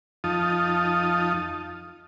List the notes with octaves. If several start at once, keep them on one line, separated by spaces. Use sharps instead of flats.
F2 F3 D#4 F4 A5 D#6